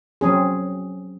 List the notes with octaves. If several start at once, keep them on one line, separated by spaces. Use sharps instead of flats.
F#3 C4 C#4 G#4